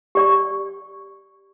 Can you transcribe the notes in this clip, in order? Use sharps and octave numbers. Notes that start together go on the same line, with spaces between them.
G4 D5 C#6